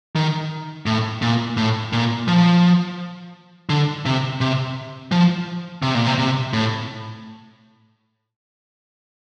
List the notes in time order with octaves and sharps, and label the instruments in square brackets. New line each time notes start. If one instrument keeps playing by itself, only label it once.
[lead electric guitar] D#3
A2
A#2
A2
A#2
F3
D3
C3
C3
F3
C3
A#2
C3
C3
A2